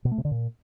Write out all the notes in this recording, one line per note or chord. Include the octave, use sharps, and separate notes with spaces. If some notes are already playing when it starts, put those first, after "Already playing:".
B2
A3
C3
D3
A#2